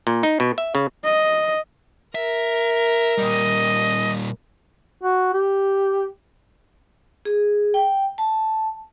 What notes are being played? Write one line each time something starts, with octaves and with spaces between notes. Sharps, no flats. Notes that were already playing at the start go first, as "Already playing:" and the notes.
A#2
D#4
B2
E5
C#3
D#5
A#4 E5
A#2 G3 D#5
F#4
G4
G#4
G5
A5